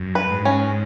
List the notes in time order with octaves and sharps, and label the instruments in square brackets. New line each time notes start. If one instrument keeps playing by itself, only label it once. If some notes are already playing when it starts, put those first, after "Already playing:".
Already playing: [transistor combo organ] F#2
[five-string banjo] B4
[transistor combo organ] G#2
[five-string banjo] C#4